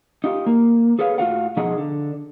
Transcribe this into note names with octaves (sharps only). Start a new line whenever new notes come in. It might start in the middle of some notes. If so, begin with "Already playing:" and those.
D#4 F4 G4
A#3
G#4 A4 B4 C#5 F5
A2 C4 F4 F#4 F5 F#5
B2 F3 D#4 G#4 D#5 F#5
D3